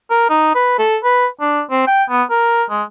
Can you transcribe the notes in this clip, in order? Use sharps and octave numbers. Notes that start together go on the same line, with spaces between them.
A#4
D#4
B4
A4
B4
D4
C4
G5
B3
A#4
G#3